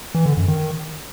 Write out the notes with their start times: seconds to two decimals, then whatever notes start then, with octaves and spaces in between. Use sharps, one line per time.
0.15 E3
0.26 D3
0.37 F#2
0.48 D#3